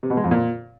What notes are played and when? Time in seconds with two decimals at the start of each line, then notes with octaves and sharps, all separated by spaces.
0.03 C3
0.10 B2
0.17 G#3
0.24 F2
0.31 A#2